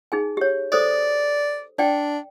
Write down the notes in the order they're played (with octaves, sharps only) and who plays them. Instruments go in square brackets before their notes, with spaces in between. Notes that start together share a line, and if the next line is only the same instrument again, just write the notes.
[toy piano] D#4 G#4 G#5
G4 C#5
[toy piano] A4 C5 D#6 [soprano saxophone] D5
[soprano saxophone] D4 [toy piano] D5 G5